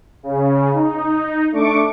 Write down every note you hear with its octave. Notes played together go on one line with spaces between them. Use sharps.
C#3
D#4
A3 D4 C#6 D6